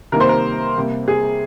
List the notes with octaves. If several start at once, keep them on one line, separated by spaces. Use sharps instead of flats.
C3 D#3 G3 A#3 A#4
C5
A#4
C3 G3 A#3
G#4